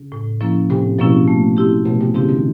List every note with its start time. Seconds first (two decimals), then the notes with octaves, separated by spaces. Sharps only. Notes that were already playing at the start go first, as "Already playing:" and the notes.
Already playing: C#3
0.12 A2
0.41 F3 A#3 C#4 E4
0.70 A2 C3
0.98 B2 F3 A#3 C#4 E4
1.28 A3
1.57 C4 E4 G4
1.85 B2 A3
2.01 C3
2.14 C#3 C4 E4 G4
2.29 D#3